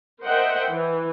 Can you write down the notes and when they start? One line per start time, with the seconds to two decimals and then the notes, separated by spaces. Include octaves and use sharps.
0.24 A#4 C5 D#5 E5 F#5 G5
0.70 E3